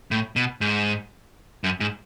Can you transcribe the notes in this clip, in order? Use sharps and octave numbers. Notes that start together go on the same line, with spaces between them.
A2
B2
G#2
F#2
G#2